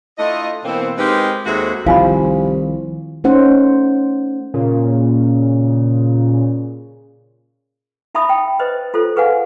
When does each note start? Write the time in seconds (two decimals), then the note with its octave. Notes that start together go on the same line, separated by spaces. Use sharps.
0.19 A3 D4 E4 F4 D#5
0.65 B2 E3 A#3 C4
0.97 G#3 C4 D#4 G4 A#4 B4
1.46 D#2 G#3 A3 C4 F#4 G#4
1.86 C2 D#3 F3 F5 G#5 B5
3.24 A3 C#4 D#4 C5 F#5
4.54 A#2 C#3
8.15 D#4 E5 A5 B5 D#6
8.29 G5
8.59 B4 C5 D#5
8.94 F4 A4 C5
9.16 G#4 B4 F5 F#5 G#5